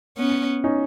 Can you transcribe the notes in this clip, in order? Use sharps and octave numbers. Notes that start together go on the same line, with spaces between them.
B3 C#4
C#4 D#4